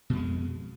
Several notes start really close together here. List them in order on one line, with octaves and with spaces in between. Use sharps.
B2 F2 G#3